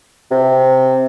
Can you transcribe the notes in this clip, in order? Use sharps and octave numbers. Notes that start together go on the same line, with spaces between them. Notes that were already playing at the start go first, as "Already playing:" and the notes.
C3